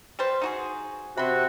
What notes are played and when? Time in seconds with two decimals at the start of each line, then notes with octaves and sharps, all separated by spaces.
0.19 G3 B4 C5
0.42 D#4 F#4 G#4
1.17 C3 C4 F#4 B5 C6